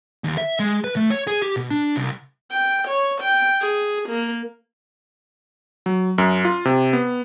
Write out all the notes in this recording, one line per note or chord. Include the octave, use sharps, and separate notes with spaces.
D#2
E5
G#3
B4
A3
C#5
G#4
G4
B2
D4
C2
G5
C#5
G5
G#4
A#3
F#3
F#2
F4
C3
B3